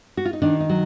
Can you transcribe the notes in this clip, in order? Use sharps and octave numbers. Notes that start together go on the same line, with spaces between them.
F#4
F4
D#4
D#3 D4
D#4
F#3